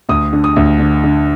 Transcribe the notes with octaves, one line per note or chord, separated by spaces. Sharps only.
D2 D#6
D3
D#6
D2
D3
D3